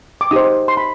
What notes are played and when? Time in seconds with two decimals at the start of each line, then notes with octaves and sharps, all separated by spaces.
0.21 D6
0.31 D#4 G4 C5 D#6
0.68 C6
0.77 B5